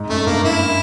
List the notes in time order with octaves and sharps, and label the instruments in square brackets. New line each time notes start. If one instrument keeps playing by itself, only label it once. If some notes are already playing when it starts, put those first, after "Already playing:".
Already playing: [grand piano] G#2
[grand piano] F#2 [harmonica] A3
[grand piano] G2 [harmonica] A#3
[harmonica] E4